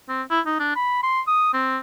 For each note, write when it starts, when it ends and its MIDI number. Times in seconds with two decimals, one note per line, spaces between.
0.09 0.22 60
0.30 0.40 64
0.46 0.55 63
0.60 0.76 62
0.76 1.01 83
1.03 1.21 84
1.27 1.52 87
1.54 1.78 60